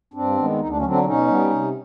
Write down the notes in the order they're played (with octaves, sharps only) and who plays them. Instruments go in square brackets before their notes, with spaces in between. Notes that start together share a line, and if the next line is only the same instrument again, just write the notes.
[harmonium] G2 C4 D4
D#3 G#3 B3
D2 D#4
D4
C#4
D3 F#3 C4 D4
B2 C#4 D#4
G3 B3
C3